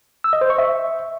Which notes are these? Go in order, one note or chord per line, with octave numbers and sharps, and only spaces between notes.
E6
D#5
C5
C#6
E5